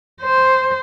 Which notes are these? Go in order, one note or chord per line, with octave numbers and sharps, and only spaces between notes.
C5